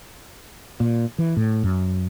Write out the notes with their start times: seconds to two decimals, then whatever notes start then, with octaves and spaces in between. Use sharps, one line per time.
0.80 A#2
1.18 E3
1.37 A2
1.63 F#2